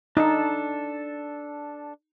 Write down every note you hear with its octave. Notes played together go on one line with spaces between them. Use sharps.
D4 D#4 A4